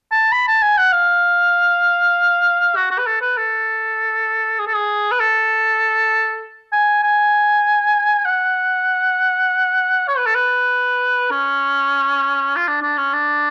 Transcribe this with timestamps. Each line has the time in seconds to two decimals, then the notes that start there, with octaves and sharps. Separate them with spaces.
0.11 A5
0.32 B5
0.48 A5
0.62 G#5
0.78 F#5
0.92 F5
2.76 F#4
2.91 F#4
2.98 B4
3.07 A4
3.21 B4
3.37 A4
4.59 G#4
4.67 A4
4.74 G#4
5.11 B4
5.20 A4
6.72 G#5
7.03 G#5
8.25 F#5
10.08 C#5
10.17 B4
10.26 A4
10.35 B4
11.31 C#4
12.56 F4
12.68 D4
12.82 D4
12.98 C#4
13.13 D4